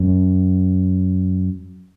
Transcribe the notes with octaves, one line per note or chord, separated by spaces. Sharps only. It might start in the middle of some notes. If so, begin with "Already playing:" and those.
Already playing: F#2